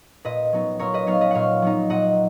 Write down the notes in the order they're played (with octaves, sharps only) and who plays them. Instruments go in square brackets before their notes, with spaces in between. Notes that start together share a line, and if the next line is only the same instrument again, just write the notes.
[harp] A#2 B4 D#5
F#3 B3 D#4
A#2 A#4 C#5
B4 D#5
F#3 B3 D#4 C#5 F5
B4 D#5
A#2 C#5 F5 F#5
F#3 B3 D#4
A#2 D#5 F#5